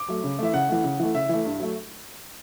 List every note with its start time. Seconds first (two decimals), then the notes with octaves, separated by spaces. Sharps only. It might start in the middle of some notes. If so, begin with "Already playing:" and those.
Already playing: D6
0.09 F#3 A3
0.24 C#3
0.39 E3 A3 E5
0.54 C#3 F#5
0.69 E3 A3
0.84 C#3
1.00 E3 A3
1.15 C#3 E5
1.29 E3 A3
1.45 G2
1.60 F#3 A3